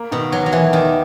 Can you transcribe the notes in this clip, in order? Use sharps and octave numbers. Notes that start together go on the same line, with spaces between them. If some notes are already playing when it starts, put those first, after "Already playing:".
Already playing: A#3
B2 D#3
D#2 F#3
F#3
E3 A#3
D#2 D#3